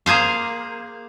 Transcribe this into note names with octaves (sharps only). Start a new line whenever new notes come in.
A#3 G#4 C5 F5